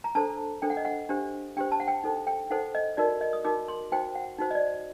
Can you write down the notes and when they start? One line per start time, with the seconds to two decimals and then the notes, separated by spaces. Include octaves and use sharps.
0.04 A#5
0.15 D4 A4 C5 A5
0.62 D4 A4 C5 G5
0.70 F#5
0.77 D#5
0.85 F#5
1.09 D4 G4 C5
1.57 D4 G4 C5 G5
1.72 A5
1.80 F#5
1.88 G5
2.04 D#4 A4 C5
2.27 G5
2.50 D#4 A4 C5 F#5
2.75 D#5
2.97 D#4 F#4 A#4 D5
3.21 D#5
3.33 D#6
3.45 D#4 F#4 A#4 D6
3.68 C6
3.92 D#4 F#4 C5 G5
4.15 F#5
4.39 D#4 F#4 C5
4.51 D#5
4.55 D5